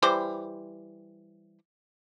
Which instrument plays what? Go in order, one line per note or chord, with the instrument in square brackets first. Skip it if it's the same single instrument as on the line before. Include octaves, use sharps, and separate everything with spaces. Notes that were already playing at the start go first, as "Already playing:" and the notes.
[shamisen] E3 G3 C5